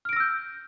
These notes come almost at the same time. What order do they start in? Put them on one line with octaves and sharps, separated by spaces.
F6 D7 A#6 E6 G6